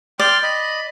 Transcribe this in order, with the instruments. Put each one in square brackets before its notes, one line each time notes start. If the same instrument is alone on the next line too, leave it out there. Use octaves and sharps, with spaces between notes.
[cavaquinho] D5 [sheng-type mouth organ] G5 C6 F6
[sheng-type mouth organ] D#5 B5